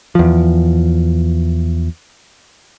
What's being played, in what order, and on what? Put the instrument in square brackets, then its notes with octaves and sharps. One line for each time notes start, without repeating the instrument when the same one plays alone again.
[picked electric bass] E2 F3